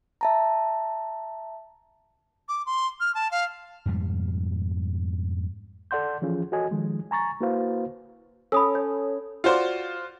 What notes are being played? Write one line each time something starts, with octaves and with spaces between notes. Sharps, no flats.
E5 A5 A#5
D6
C6
F6
A5
F5
F2 G#2 B2 G3
A4 D5 F#5 C6 G6
E3 F3 C#4 F4 G#4
F#4 A4 C#5 D#5 G#5
D#3 F3 G#3
G#5 A#5 C#6 A6
A#3 E4 F#4 B4 C5 F5
C#4 A4 B5 D#6 E6
C#5
F4 F#4 C5 D5 C6